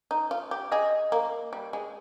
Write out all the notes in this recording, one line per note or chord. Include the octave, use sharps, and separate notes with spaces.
D#4
F4
G4
G#4 D#5
A#3
G3
G#3